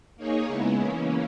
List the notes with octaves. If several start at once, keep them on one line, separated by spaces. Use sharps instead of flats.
A#3 D#4 G#4 C#5
C#3 G#3 B3 E4
C#3 E3 A#3 C#4